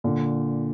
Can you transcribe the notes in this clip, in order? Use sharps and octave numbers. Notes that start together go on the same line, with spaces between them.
A#2 D3